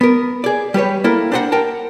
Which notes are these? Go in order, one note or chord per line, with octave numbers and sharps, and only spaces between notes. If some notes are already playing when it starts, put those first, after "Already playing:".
B3 A#4
G#4 D5
G3 G4 B4 C#5
A#3 E4 A4 A#4
D4 G4 C5 D#5 F#5 A#5
A#4 G5 A5